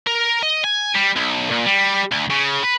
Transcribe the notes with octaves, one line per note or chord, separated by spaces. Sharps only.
A#4
D#5
G#5
G3
B1
A#2
G3
D2
C#3
B4